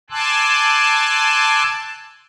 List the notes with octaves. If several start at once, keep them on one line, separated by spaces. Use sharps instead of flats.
G#5 A5 C6 D6 E6 F#6